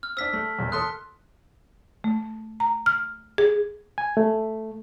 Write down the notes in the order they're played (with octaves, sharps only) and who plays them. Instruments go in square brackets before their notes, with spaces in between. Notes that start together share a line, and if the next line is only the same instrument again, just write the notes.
[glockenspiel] F6
[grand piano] C4 D4 [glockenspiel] E6 B6
[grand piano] A3
F#1 E2
[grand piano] A4 C6 D#6 [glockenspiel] F#6
[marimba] A3
A#5
F6
G#4
[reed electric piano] G#5
A3